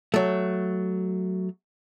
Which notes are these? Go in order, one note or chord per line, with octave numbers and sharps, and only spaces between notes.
F#3 A3